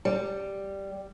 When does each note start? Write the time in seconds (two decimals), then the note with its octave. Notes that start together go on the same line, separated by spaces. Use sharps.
0.05 G3